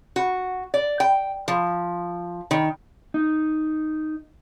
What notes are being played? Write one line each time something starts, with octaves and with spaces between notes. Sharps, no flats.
F#4
D5
G5
F3
D#3
D#4